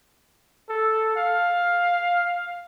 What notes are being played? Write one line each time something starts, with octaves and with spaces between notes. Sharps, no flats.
A4
F5